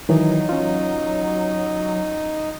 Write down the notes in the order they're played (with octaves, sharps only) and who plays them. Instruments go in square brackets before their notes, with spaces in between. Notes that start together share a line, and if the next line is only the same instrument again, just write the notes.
[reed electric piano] D#3 E3 [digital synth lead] F#3 [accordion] D#4
[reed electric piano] C#4 F4